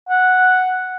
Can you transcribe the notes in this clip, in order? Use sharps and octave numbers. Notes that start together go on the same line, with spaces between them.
F#5